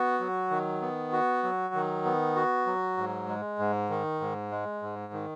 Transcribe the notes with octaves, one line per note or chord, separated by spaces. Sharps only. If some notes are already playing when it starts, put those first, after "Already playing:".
Already playing: B3 F#4
F#3
D#3
B3
F#4
F#3
D#3
B3
F#4
F#3
G#2
G#3
G#2
D#3
G#2
G#3
G#2
D#3